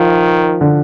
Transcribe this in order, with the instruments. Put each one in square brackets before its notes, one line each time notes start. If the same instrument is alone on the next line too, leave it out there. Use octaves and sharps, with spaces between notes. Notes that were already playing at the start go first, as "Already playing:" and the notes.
Already playing: [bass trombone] D#3 [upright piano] F3
[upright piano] D3